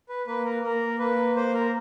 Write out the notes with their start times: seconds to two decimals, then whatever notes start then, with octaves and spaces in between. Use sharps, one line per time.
0.09 B4
0.27 A#3 B4
0.45 A#4
0.63 A#3 A#4
0.99 A#3 B4
1.36 A#3 C5
1.54 A#4